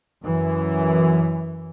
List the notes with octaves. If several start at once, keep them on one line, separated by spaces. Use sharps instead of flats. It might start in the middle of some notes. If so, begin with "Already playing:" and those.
F#2 E3